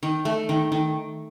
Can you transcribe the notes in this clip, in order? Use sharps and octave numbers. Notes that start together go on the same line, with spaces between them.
D#3
A3
D#3
D#3